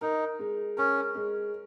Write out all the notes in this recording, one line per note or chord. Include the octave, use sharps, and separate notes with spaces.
D#4 A#4
G#3
C#4 A#4
G#3